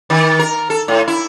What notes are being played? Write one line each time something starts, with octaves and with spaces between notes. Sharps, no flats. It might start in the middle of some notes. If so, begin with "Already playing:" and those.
D#3
A#4
A4
A2
E4